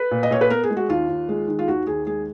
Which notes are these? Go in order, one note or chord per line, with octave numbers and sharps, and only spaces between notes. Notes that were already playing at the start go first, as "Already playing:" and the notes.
Already playing: B4
A#2
D#5
A#2 C#5
B4
B3 A#4
G#4
G#3
F#4
D#2 F4
D#2
G#3
D#3
F4
D#2 F#4
D#2 G#4
G#3 G#4